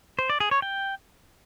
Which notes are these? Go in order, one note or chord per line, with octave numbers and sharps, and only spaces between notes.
C5
D5
G#4
C#5
G5